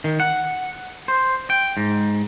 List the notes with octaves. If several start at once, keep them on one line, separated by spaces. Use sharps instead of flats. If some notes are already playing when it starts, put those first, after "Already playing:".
D#3
F#5
C5
G5
G#2